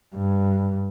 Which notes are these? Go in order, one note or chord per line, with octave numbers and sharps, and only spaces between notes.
G2